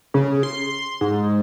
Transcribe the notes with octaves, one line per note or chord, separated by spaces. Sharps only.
C#3
C6
G#2